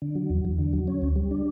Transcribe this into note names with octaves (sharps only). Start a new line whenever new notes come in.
D3
F#3
E2
E2
D3
F#3
C#4
D2
G3
D4